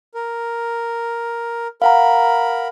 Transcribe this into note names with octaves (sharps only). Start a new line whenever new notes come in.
A#4
A#4 F5 F#5 A#5 B5